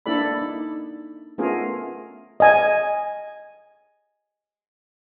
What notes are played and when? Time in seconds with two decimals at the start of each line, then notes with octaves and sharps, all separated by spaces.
0.06 A#3 D4 E4 A4 D5 B5
0.41 D#4
1.38 A3 B3 C#4 F4 G#4 A#4
2.40 D#5 G#5